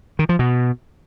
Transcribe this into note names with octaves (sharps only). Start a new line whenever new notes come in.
D#3
F3
B2